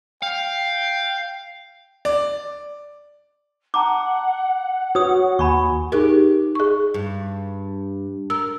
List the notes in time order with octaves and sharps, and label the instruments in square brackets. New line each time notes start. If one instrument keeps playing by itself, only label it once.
[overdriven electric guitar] F5 [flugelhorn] G5
[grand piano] D5
[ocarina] F#5 [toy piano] A5 A#5 D6
[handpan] F#4 [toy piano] B4 D#6 [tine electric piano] C#5
[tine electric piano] D#2 G#5 [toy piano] B5 C#6
[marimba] D#4 G#4 A#4 [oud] G4
[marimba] G#4 C#6
[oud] G2
[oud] A#4 [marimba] E6